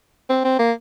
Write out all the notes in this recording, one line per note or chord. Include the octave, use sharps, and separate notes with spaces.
C4
C4
A#3